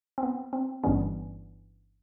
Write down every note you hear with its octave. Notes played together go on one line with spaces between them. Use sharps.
C4
B3
C4
G1 G2 E3 G3 B3 C#4